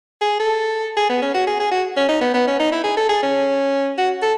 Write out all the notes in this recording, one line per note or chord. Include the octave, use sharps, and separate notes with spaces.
G#4
A4
G#4
B3
C#4
F#4
G#4
G#4
F#4
C#4
D#4
B3
B3
C#4
D#4
E4
G#4
A4
G#4
C#4
F#4
A4